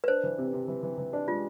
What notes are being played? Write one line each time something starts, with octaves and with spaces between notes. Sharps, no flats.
B4
D4 C5
E3
C3
C3
E3
E3
E3
D4
G#3 F4